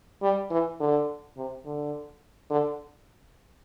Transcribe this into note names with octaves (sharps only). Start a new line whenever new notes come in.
G3
E3
D3
C3
D3
D3